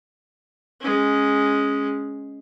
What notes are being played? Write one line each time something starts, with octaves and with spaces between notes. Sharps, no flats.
G#3 C#4